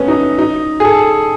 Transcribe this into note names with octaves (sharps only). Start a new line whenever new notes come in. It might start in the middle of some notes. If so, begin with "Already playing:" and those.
Already playing: A3 B3 C#4
D#4
D#4
G#4
A4